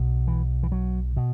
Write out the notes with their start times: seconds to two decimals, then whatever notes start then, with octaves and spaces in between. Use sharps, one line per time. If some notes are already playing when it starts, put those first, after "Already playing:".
Already playing: B1 B2
0.28 E3
0.63 E3
0.72 F#3
1.17 B2